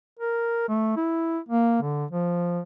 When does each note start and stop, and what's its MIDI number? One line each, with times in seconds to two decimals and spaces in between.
0.20 0.65 70
0.69 0.92 57
0.97 1.38 64
1.49 1.80 58
1.82 2.05 50
2.11 2.60 53